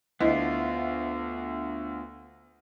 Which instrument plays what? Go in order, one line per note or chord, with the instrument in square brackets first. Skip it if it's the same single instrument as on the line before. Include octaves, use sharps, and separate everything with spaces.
[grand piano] D2 [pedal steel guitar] B3 D4 F4 [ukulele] E4 [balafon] D#5